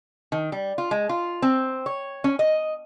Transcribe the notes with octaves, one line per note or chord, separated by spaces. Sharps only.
D#3
G3
F4
G#3
F4
C4
C#5
C#4
D#5